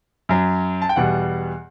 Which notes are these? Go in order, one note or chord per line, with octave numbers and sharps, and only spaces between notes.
F#2 F#3
A5
G5
E2 B2 G3 F#5